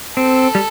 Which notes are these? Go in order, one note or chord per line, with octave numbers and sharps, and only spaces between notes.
C4 A4
G3